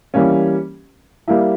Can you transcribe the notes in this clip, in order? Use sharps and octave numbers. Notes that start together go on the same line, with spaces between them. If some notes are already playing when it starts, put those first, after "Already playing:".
E3 G3 A#3 C#4
G3 A#3 E4